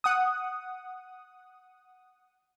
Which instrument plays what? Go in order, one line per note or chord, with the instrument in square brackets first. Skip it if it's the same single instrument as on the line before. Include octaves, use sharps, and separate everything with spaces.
[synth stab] F#5 D#6